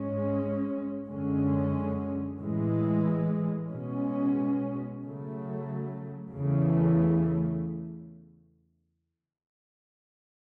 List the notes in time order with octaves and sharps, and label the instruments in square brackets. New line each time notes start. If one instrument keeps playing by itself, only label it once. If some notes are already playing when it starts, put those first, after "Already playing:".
Already playing: [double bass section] G#2 G#3 C#4
F#2 D3 G#3 C#4
A2 E3 G#3
B2 G#3 C#4
C#3 F#3 A3
E2 C#3 E3 A3